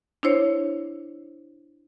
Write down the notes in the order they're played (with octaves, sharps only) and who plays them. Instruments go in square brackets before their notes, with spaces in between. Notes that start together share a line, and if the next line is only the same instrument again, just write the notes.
[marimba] D4 E4 C5 C#5